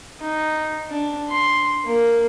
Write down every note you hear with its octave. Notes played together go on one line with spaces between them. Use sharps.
D#4
D4
C6
A#3